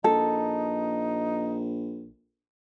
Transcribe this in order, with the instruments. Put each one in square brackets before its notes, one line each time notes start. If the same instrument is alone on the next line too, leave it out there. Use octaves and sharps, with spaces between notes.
[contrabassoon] A#1 [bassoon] D#4 [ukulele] A4